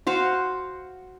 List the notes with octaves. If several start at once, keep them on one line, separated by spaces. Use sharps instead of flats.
F#4 C5 F5